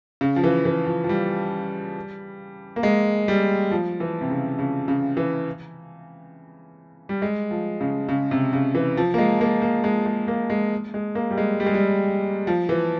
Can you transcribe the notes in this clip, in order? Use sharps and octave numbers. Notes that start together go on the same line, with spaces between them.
C#3
F3
E3
E3
F3
F3
G3
A#3
G#3
G3
F3
E3
C3
C#3
C#3
C#3
E3
G3
G#3
F3
C#3
C#3
C3
C#3
E3
F3
A#3
G#3
A#3
A#3
G#3
G#3
A#3
G#3
G#3
A#3
G3
G#3
G3
G#3
G3
F3
E3